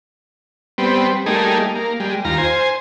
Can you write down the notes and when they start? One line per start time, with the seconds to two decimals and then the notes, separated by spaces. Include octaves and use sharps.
0.78 G3 B3 C4
1.26 G3 A3 A#3 D#4 G#4
1.75 A#3
2.00 G3 G#3
2.25 D#2 F4 A#5
2.38 C5 G#5